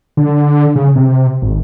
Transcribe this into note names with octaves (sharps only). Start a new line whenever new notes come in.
D3
C#3
C3
G#1